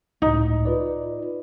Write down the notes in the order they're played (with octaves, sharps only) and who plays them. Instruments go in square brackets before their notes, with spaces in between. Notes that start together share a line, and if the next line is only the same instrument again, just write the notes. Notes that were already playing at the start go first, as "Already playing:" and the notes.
[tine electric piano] C#2 A2 [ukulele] D#4
[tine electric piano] F4 B4 D5